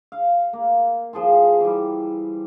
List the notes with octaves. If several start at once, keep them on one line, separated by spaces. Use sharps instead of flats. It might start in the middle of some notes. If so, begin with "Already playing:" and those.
F5
A#3
F3 G#4 A5 C6
E3 G3